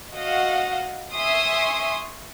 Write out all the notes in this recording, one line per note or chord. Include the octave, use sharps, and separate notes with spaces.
F#4 D#5 F5 F#5
E5 G#5 C6 C#6 D#6